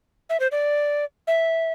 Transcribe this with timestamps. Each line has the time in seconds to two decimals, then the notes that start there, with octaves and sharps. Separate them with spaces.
0.30 E5
0.40 C5
0.52 D5
1.27 E5